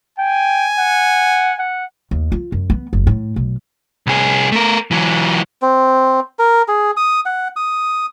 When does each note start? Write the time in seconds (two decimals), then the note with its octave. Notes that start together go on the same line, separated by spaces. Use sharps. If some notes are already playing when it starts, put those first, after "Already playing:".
0.19 G5 G#5
0.78 F#5
1.59 F#5
2.11 D#2
2.32 F4
2.52 F#2
2.70 B3
2.93 F#1
3.07 A2
3.36 B1
4.07 C2 G#4
4.52 A3 A#4
4.91 E3 F#3
5.62 C4
6.39 A#4
6.68 G#4
6.97 D#6
7.26 F#5
7.56 D#6